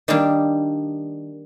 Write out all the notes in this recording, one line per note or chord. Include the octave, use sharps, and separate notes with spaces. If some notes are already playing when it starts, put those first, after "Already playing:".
D#3 G3 A#3 D4